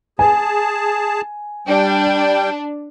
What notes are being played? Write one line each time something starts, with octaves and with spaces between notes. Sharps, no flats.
G#4 G#5 A5
G3 D4 G5